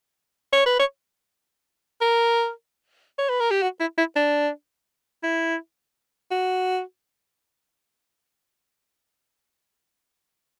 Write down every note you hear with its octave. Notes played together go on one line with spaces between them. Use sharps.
C#5
B4
C#5
A#4
C#5
B4
A#4
G4
F#4
E4
E4
D4
E4
F#4